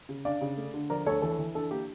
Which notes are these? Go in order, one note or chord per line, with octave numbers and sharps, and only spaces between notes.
C#3
D4 D5 F5
C#3
A3
D3
F3 A#4 D5
D2 A4 C#5
E3 A4
E3
D4 A4
A#3 G4